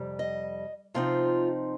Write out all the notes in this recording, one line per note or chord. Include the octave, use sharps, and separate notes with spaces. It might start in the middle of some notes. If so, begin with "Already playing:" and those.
Already playing: F2 C3 G3
D#5
C3 F3 C4 D#4 F4